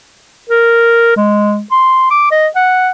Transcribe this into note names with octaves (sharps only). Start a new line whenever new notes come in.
A#4
G#3
C6
D6
D#5
F#5